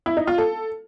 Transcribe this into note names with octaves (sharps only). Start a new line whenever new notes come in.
E4
D#4
F4
A4